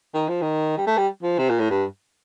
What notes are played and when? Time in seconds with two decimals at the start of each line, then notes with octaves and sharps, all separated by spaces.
0.14 D#3
0.28 F3
0.42 D#3
0.77 G3
0.87 A3
0.97 G3
1.23 F3
1.38 C3
1.49 A#2
1.59 A2
1.70 G2